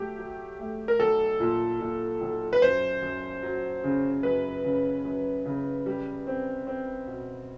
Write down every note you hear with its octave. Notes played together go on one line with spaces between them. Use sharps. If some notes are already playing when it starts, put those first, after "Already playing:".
Already playing: F#3 A3 G4
F#3
A3
A#4
B1 A4
A#2
A#2
B1
B4
F#2 C5
F#2
F#3
C#3
F#2 B4
C#3
F#2
C#3
G3
C4
C4
B2